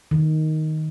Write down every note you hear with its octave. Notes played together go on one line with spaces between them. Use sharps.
D#3